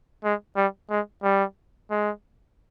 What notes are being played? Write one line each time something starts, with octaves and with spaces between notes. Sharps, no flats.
G#3
G3
G#3
G3
G#3